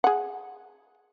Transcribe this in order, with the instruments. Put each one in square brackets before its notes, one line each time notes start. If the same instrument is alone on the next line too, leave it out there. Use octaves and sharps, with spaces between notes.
[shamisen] G#4 F#5